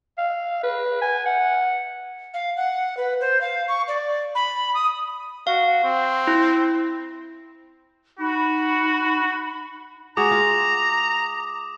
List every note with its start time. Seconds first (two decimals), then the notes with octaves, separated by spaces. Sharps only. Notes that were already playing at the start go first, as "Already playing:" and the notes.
0.18 F5
0.63 B4
1.02 G#5
1.26 F#5
2.34 F5
2.57 F#5
2.97 B4
3.21 C5
3.41 F5
3.68 C#6
3.88 D5
4.35 B5
4.74 D#6
5.47 F#4 F5
5.84 C4
6.27 E4
8.19 D#4 F#4 B5
10.17 G#3 F#4 G#4 A#5 D6 D#6
10.31 F4